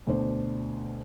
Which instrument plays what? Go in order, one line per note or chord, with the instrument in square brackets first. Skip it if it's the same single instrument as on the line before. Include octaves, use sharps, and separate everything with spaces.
[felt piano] D2 B2 D4 C5